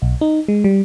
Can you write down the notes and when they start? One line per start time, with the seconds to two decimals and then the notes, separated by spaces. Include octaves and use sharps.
0.02 B1
0.21 D#4
0.48 G#3
0.64 G3